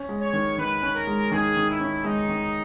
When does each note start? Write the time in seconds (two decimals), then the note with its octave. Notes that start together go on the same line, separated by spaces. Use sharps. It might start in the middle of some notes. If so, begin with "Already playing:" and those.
Already playing: C#4
0.09 G#3
0.21 C#5
0.33 D#3
0.58 D#3 B4
0.82 C#4
0.95 A#4
1.07 G#3
1.31 D#3 G#4
1.56 D#3
1.69 E4
1.80 C#4
2.04 G#3 D#4
2.29 D#3